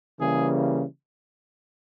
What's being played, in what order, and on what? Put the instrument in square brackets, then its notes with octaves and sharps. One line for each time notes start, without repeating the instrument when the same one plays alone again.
[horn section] C#3 E3 G3 A#3 G#4